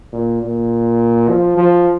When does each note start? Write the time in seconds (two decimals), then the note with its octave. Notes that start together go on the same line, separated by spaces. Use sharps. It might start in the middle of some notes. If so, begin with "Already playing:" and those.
0.13 A#2
0.43 A#2
1.29 F3
1.57 F3